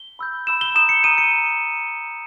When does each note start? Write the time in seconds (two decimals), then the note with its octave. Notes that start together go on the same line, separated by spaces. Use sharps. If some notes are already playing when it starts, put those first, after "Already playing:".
Already playing: G7
0.19 B5 E6 G6
0.47 B5 E6 G6 E7
0.61 G7
0.75 A#5 D#6 G6 E7
0.89 C#7
1.03 A#5 D#6 G6 D#7
1.18 C#7